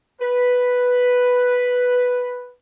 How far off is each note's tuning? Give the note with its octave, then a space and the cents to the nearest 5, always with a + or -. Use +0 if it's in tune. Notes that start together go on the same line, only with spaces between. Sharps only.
B4 +0